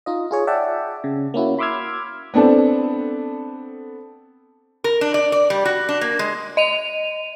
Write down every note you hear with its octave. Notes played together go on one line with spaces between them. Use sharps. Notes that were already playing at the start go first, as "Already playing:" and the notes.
D#4 F4 D#5
F4 G#4 C#5
D5 E5 F#5 G5 A5
C#3
A#3 C#4 E4 F#4
B5 C6 D6 E6 F6 G#6
B3 C4 D4 A4
A#4
D4
D5
D5
G3
F#4
D4
A#3
G#3
D#5 D#7 F7